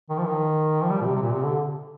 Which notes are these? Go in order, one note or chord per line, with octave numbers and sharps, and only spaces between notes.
D#3
F3
D#3
F3
G3
A#2
C3
C3
A#2
C3
D3